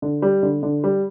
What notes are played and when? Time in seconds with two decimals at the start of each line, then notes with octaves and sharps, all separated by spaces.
0.02 D3
0.22 G3
0.43 D3
0.63 D3
0.84 G3